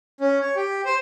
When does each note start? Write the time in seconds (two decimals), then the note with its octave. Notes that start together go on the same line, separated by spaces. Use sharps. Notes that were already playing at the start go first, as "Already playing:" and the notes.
0.21 C#4
0.41 C#5
0.56 G4
0.85 C5